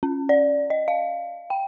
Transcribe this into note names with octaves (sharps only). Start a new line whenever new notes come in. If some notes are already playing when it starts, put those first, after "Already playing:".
C#4
D5
D#5
F5
G5